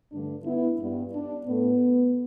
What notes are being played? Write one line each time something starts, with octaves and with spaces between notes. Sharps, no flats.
G2 D3 A3 D4
B3 E4
G2 G3 B3
D4
A2 A3 B3